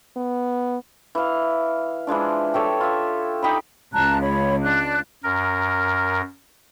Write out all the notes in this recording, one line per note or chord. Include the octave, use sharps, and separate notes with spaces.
B3
E3 F5
E3 F3 G#3 D4
G4 A4 C#5
F4 E5
D#4 G4 D#5 B5
C#2 A5 A#5 F#6
C#5 B5
D4 F#6
F#2 A#4